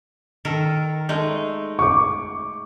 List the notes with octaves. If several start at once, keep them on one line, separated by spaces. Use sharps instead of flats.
D#3 A4 A#4
G#3 A3 D#4
C#6 D6